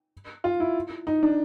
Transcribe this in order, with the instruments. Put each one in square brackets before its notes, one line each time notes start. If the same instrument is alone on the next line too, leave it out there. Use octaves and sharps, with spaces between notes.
[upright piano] F4
E4
D#4
D4